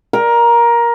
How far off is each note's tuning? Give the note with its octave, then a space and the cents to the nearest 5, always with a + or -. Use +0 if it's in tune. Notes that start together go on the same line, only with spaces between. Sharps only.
A#4 +15